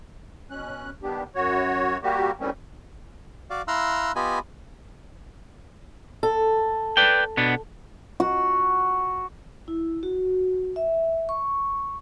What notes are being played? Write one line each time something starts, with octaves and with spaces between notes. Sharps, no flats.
B2 C#4 F#6
D#3 G3 B3 D4 G4
F#2 F#4 C#5
G3 A#3 F#4 G4
D#3 E3 G3 A3 C4 C#4
F#4 D5 F5
E4 F5 A#5 C6 E6 F#6
B3 F4 G4 D#5 G#5 B5
A4
B4 D5 G5
B2 B3 D4
F#4
E4
F#4
E5
C#6